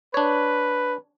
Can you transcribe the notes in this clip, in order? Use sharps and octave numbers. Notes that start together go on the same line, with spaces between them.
D4 B4 C#5